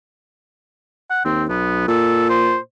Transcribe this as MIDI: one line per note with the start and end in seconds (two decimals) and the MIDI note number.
1.10 1.23 78
1.25 1.47 39
1.25 1.44 60
1.49 1.87 35
1.49 1.85 59
1.88 2.56 46
1.88 2.29 69
2.29 2.57 72